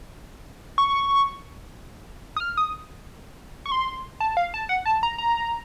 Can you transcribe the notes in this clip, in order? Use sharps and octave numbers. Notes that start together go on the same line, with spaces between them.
C#6
D#6
F6
D#6
C#6
C6
A5
F5
A5
F#5
A5
A#5
A#5